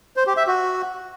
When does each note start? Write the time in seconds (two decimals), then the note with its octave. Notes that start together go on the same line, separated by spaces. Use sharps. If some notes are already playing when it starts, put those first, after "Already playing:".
0.16 C5
0.27 G4
0.37 E5
0.47 F#4